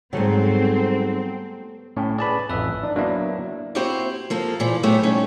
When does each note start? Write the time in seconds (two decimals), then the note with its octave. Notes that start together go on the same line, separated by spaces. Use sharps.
0.13 G#2 F#3 G3 A3 B3 C4
1.97 A2 C#4 G5
2.19 G#4 B4 D5 A5 B5
2.49 A1 F2 B4 E5
2.83 D4 D#4
2.96 F#3 A#3 B3 D4 E4
3.75 A#3 C4 E4 F#4 G4 C5
4.30 F3 A#3 A4
4.60 A#2 E3 F3
4.83 A2 F#3 A3 B3 G4 C#5
5.03 D#3 G3 A3 C#4